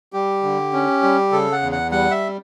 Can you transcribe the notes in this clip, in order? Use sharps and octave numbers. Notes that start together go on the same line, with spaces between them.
G3 G4
D3
C#4
G3
C#3 A4
F#5
E2
F#5
G3 F#5
E5